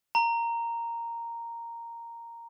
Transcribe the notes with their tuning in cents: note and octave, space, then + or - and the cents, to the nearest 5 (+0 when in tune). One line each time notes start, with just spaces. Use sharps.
A#5 -5